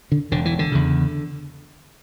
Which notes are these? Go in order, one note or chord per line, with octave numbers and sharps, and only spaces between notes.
D3
E1 D3
E3
D3
E2 C#3